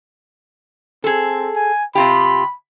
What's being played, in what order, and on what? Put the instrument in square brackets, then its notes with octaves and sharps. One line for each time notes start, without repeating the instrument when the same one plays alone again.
[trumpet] C4 [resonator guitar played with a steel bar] G#4 A4
[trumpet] G#5
[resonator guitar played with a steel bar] C3 F4 G4 [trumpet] B5